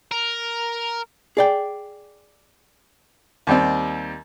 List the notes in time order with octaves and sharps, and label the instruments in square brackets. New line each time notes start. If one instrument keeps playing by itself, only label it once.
[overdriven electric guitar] A#4
[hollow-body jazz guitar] G#4 D5 G5
[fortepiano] D#2 G3 C4